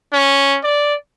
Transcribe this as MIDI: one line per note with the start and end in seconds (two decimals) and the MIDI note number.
0.13 0.58 61
0.63 0.94 74